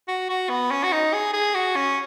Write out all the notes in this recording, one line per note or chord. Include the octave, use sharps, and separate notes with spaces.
F#4
F#4
B3
C#4
F#4
D#4
G#4
G#4
F#4
C#4